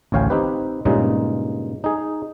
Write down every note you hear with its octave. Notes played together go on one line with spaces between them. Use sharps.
A1 D2 C#5 F5 G5 G#5
C4 D#4 G4 B4
G2 A#2 C#3 G#3 D#4
D#4 G#4